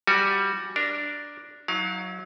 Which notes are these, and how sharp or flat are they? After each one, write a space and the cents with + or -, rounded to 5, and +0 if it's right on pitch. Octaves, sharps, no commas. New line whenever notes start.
G3 +0 F#4 +0 G#5 +0
D4 +0 A#4 +0
F#3 +0 E4 -45 F5 +25